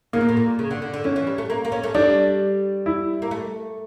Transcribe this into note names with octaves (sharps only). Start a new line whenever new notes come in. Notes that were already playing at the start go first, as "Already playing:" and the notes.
C#3 A#3
A#2
A2
A#2
C#3
D3
D3
D3
E3 C#4
E3
G3
A3
A#3
A#3
C#4
A3
G3 D4
E4
A#3
A3